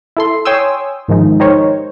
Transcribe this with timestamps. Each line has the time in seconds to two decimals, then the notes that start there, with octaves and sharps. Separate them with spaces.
0.17 E4 A4 C6
0.45 C#5 G5 G#5 C6 D#6 E6
1.08 G#2 D#3 F3 G#3 D#4
1.40 D#4 G4 A#4 C5 C#5